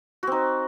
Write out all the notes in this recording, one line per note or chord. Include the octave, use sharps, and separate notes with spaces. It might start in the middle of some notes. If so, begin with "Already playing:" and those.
C4 D#4 F#4